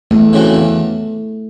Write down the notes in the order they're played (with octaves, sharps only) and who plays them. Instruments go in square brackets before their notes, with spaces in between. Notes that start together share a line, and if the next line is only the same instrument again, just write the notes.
[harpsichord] E2 [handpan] A3
[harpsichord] C#3 E3 C4 F#4
E2